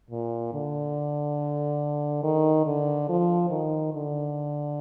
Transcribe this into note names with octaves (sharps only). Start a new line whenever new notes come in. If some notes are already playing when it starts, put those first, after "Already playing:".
A#2
D3
D#3
D3
F3
D#3
D3